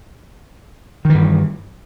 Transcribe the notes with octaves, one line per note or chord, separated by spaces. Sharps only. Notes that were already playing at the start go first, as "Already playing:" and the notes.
G2 D#3 E3